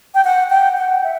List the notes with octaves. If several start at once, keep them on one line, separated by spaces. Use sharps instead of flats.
G5
F#5
G5
F#5
E5